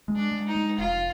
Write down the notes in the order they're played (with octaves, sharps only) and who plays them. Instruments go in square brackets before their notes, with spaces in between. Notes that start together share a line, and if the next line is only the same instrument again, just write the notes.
[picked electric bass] G#3
[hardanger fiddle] D4
[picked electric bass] G#3
[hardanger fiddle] D#4
[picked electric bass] G#3
[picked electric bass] F1 [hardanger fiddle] F4